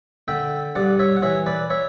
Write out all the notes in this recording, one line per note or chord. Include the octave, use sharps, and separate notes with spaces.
D3 E5 G5
G2 D5 F#5
C#5 E5
F#5
E3 C#5 E5
B4 D5
C#5 E5